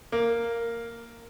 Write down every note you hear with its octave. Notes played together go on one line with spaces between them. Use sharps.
A#3